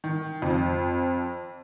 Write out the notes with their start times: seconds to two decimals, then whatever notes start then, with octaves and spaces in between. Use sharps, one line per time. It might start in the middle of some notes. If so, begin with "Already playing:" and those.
0.04 D#3
0.42 F2